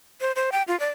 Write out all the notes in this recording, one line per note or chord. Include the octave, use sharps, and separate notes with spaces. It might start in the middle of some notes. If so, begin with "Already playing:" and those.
C5
C5
G5
F4
D5